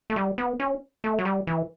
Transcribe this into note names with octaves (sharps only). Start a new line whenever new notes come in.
A3
G3
B3
C#4
A3
F#3
G3
E3